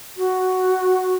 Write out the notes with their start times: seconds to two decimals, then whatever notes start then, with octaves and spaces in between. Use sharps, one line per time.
0.17 F#4